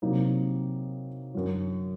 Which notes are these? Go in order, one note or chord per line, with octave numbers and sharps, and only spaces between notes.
C3 F#3 A#3 D#4
F#2 D3 F#3